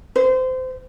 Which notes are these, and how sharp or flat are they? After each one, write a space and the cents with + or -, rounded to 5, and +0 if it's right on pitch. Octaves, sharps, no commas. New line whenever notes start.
C5 -25